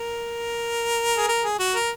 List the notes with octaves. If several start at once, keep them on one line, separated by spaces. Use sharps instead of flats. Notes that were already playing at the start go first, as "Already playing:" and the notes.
Already playing: A#4
G#4
A#4
G#4
F#4
A#4